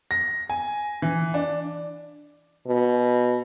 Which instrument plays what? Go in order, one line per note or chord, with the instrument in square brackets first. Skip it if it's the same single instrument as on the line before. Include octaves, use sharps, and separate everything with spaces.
[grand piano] A#6
G#5
E3
D4
[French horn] B2